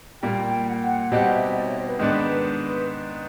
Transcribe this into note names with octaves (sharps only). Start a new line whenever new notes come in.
A#2 G3 A#3 G5
G5
F#5
G5
F#5
B2 G3 C4 D#4 G4 F#5
E5
D5
C#5
C5
B4
G#2 D#3 G#3 B3 D4 B4
B4